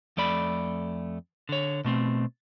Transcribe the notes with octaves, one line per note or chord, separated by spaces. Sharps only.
F2 A3 D5 B5
D3 C#5
B2 A3 C4